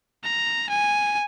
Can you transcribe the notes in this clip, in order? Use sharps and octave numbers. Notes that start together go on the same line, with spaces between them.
A#5
G#5